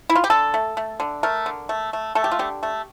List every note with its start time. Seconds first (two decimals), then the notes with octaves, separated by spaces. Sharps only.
0.10 E4
0.16 F4
0.24 G4
0.30 D3 A4
0.54 A3
0.77 A3
1.00 D3
1.23 A3 A#4
1.46 D3
1.69 A3
1.93 A3
2.15 A3 A4
2.24 G4
2.32 F4
2.39 D3 G4
2.63 A3